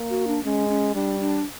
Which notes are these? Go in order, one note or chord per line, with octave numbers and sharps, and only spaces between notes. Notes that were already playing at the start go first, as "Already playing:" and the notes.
Already playing: A#3
F#4
D4
G#3 C#4
C#4
G3 D4
D4